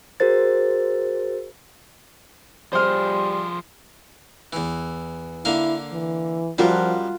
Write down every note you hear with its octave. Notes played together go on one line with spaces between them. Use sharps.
F#4 G#4 A#4 C5 A6
F3 G3 G#4 C5 C6 F6
E2 E3
D3 A#3 E4 F5
E3
F#2 F3 G3 F4 F#4 A#4